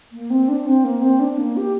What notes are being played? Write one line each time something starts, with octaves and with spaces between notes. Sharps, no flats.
A#3
C4
D4
C4
A#3
C4
D4
A#3
G4